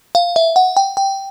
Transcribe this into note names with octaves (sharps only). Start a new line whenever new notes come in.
F5
E5
F#5
G5
G5